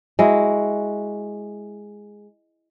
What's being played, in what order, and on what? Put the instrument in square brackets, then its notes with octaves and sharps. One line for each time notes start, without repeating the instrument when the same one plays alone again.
[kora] G#3 E4 F#4